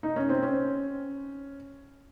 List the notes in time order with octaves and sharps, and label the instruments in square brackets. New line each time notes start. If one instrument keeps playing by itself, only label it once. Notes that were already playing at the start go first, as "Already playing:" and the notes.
[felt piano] D#4
C#4
C4
C#4